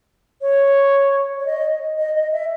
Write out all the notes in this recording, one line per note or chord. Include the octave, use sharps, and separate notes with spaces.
C#5
C#5
D#5
D#5
D#5
E5